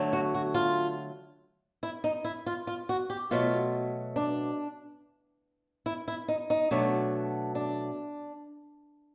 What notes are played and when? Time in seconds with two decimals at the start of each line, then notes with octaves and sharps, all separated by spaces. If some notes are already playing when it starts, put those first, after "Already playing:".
Already playing: D3 F#3 A3
0.13 F#4
0.34 F#4
0.54 F4
1.83 E4
2.04 D#4
2.25 E4
2.46 F4
2.67 F4
2.89 F#4
3.10 G4
3.31 B2 F#3 A3 F4
4.16 D4
5.86 E4
6.08 E4
6.28 D#4
6.50 D#4
6.71 B2 F#3 A3 D4
7.55 D4